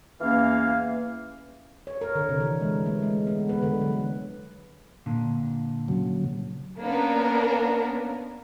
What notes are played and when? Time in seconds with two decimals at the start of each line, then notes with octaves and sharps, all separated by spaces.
0.20 E2 E3 A#3 C#4 F5
1.87 C#5
2.01 A#4
2.15 D3
2.29 C3
2.40 E3
2.61 G#3
2.86 A3
3.02 G#3
3.27 B3
3.49 B4
3.63 D3
3.81 F#3
5.06 A#2 D3
5.88 C#3 F#3
6.81 A#3 B3 C#4 D4 A#4